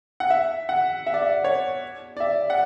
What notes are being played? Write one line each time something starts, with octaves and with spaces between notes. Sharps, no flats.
F#5
E5
F#5
E5
D5
E5
C#5
D5
E5
F#5